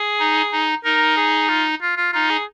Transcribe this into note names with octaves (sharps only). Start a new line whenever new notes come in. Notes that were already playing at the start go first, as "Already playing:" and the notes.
Already playing: G#4
D#4
D#4
D#4 A#4
G#4
F4
F4
F4
D#4 F4
G#4